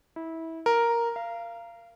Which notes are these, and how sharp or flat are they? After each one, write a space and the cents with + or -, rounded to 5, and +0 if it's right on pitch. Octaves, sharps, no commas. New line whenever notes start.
E4 -20
A#4 +0
F5 -25